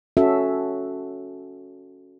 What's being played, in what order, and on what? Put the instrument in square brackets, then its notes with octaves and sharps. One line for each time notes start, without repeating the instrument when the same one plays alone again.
[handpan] C#4 F#4 A4 E5